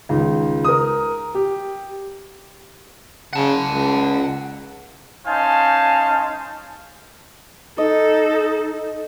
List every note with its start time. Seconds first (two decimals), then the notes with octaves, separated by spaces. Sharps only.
0.09 C#2 D#3
0.64 A#4 D#6
1.35 G4
3.33 C#3 F#5 A5
3.66 C#2
5.27 C#4 D#4 C5 F5 G#5 A5
7.78 D#4 A4 D#5